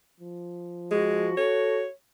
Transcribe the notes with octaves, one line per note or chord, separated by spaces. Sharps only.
F3
G#3 F#4
A4 C#5